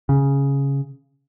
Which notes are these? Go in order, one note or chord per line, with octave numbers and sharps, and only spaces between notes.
C#3